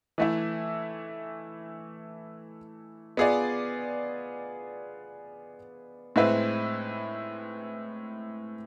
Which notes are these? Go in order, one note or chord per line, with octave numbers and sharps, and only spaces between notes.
E3 A3 E4
B3 F4 G#4 D5
A2 G#3 C4 E4 B4